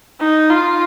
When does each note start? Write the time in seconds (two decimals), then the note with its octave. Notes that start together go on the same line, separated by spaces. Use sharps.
0.20 D#4
0.50 F4